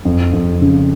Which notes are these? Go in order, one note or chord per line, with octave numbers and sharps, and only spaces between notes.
F2
F2
C#3